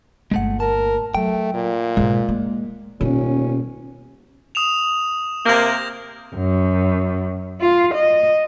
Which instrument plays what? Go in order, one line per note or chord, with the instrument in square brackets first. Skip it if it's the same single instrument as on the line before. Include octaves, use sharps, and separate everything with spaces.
[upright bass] G1 A#2 [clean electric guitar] G#3 A3 F#5
[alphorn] A#4 [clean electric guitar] A5
[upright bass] F#3 [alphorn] A3 [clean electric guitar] G5
[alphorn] A#2
[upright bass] G#2 B2 [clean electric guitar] G#3
[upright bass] A#3
[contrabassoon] D#1 [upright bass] B2 [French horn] C#4
[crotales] D#6 E7 F7
[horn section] C3 A#3 [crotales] G6 A#6
[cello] F#2
F4
D#5